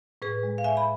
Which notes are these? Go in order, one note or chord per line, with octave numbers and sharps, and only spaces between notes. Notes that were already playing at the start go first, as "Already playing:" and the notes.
A2 G#4 B4
G#3
F5
A2 E5 G#5
B5